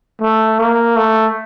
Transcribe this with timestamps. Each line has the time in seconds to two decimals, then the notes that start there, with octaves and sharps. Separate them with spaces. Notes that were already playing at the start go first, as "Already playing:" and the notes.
0.21 A3
0.59 A#3
0.97 A3